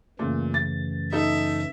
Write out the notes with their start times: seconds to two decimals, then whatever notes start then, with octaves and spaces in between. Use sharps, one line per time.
0.19 F#2 A#2 C#3 E3 A3
0.54 A6
1.12 D#4 A4 E5